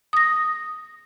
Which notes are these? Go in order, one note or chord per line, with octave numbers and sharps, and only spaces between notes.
D#6 A#6